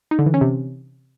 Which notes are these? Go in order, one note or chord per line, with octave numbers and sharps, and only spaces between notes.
D#4
D3
E3
C#4
C3